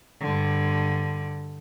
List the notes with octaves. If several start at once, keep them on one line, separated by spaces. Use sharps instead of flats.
G2 D3